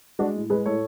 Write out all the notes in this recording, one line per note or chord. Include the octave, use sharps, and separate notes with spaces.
G#3 D4 F#4
A2
G#3 G#4 B4
A2 A4 C#5